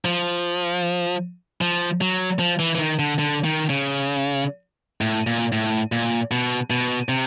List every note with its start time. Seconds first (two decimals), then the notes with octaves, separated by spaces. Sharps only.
0.05 F3
1.61 F3
2.01 F#3
2.39 F3
2.59 E3
2.75 E3
2.79 D#3
2.99 D3
3.19 D3
3.44 D#3
3.70 C#3
5.01 A2
5.27 A#2
5.52 A2
5.92 A#2
6.31 B2
6.70 B2
7.09 C3